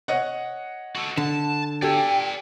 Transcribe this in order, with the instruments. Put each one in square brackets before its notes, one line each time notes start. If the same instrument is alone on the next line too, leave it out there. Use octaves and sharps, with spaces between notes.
[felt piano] C#5 D#5 F#5
[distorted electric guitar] F#4 A4
[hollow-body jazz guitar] D3 [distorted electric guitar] A5
[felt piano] G4 A4 [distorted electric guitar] D5 G#5 [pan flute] G5